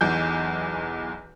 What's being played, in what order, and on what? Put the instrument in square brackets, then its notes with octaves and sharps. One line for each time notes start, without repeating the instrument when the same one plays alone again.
[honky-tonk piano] B1 E2 G6